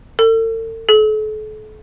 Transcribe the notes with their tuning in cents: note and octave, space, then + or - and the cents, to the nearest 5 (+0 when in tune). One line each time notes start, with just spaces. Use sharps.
A4 +45
A4 -40